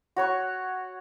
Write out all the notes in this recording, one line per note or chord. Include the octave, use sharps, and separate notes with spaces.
F#4 C#5 C#6